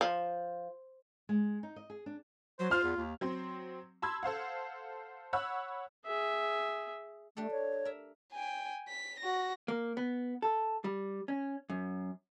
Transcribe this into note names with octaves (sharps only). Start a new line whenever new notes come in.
F3
G#3
D#4
D#5
G#4
D4
F#3 C5
F4 F6
E2
D#2
F#3 C4 C6
A5 B5 C6 E6 G#6
A4 C5 F5 F#5
C#5 F#5 B5 E6 F#6
G#4 E5
A3 D4 G4 A4
C#5
A#4 E5
G5 G#5
B6
F#4 A#6
A#3
B3
A4
G3
C#4
F#2